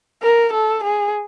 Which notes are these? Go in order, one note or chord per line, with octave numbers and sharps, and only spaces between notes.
A#4
A4
G#4